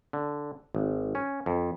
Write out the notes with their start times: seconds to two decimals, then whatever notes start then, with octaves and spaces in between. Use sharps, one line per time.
0.13 D3
0.75 G#1
1.15 C#4
1.46 F2